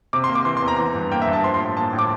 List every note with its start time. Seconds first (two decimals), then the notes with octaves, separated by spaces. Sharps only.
0.13 C3 D6
0.24 C6
0.29 A#3
0.35 D6
0.45 E3 C6
0.57 C6
0.62 E2
0.68 A#5
0.78 E3
0.95 G2
1.12 A#3 G5
1.22 E5
1.27 G2
1.33 A5
1.44 F3 C6
1.54 C6
1.60 A2
1.77 A#3 A5
1.93 A2
1.99 D6